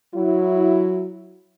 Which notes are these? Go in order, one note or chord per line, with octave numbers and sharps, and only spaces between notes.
F#3 E4